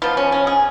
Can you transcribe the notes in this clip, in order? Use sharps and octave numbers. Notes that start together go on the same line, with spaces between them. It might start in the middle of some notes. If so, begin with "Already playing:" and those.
F3 B3 F4
C#4
C#4
G#4